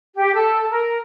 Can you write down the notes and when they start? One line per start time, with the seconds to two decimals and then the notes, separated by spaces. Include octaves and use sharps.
0.15 G4
0.34 A4
0.69 A#4